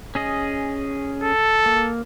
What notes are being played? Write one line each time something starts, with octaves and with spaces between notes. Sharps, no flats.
C#4 G#4 D#5
A4
A#3